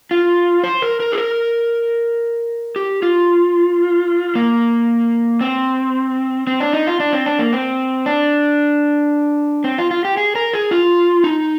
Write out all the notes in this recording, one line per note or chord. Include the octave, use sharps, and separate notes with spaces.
F4
C5
A#4
A#4
G#4
A#4
G4
F4
A#3
C4
C4
D4
D#4
F4
D4
C4
D4
A#3
C4
D4
C4
F4
F4
G4
G#4
A#4
G#4
F4
D#4